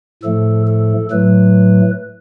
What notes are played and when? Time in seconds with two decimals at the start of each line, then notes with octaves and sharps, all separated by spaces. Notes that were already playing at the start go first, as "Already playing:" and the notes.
0.23 A2 F3 A3 A4
0.67 A4
1.11 A2 F#3 A3 B4